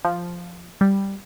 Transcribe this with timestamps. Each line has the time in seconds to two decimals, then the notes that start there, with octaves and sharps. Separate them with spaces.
0.05 F3
0.81 G3